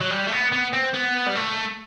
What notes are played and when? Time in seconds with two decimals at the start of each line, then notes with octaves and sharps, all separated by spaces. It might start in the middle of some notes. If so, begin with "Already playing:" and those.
0.01 F#3
0.10 G3
0.27 A3
0.32 B3
0.52 B3
0.73 C4
0.94 B3
1.27 G3
1.36 A3